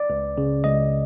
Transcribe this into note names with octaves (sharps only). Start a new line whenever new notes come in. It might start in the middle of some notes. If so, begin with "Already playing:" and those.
Already playing: D5
C#2
C#3
C#2 D#5